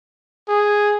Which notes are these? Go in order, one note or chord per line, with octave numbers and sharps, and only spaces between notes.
G#4